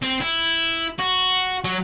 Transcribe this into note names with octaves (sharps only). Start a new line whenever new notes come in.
C4
E4
F#4
F#3